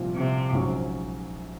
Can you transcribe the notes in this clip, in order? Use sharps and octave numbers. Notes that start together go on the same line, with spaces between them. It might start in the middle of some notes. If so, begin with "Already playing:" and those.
Already playing: C2 A#2 F3 C4 F4
C3
A#1 G#2 F#3 C#4